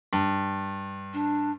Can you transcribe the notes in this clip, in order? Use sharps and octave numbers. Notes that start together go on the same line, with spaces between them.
G2
D4